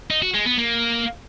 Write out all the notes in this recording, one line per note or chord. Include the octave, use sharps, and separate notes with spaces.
D#4
F#4
G#3
B3
A#3